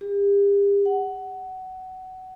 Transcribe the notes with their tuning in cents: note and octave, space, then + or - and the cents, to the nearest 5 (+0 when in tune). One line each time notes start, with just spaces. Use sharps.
G4 +40
F#5 +20